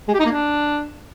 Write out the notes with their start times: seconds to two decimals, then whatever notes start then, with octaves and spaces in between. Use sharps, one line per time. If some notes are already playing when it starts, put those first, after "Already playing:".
0.08 G#3
0.14 G4
0.20 D#4
0.26 A#3
0.31 D4